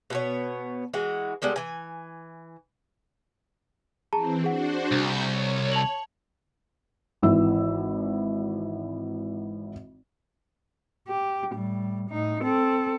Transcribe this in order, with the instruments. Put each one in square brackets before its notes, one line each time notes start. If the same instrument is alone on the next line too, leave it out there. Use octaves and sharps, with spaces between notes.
[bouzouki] B2 B3 C#5
E3 G#3 F#4
G3 G#3 B3 A4
E3 G#5
[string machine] E3 C4 [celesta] G#4 A5 A#5
[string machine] D4 F#4 C5 [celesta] G#4 F#5
[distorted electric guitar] C2 [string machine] B5 C#6 G6
[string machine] C#5
[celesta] A5 F7 F#7
[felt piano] G#1 E3 E6
[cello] G4
A2 G3
A2 D#4
C4 A4